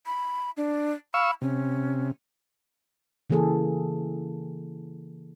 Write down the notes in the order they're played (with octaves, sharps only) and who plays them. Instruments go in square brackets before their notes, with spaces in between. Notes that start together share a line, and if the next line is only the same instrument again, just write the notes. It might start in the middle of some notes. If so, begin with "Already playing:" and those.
[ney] B5
D4
[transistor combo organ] F5 C#6 E6 [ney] B5
[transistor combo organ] C3 [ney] C#4
[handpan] C#3 E3 A#3 G#4 A4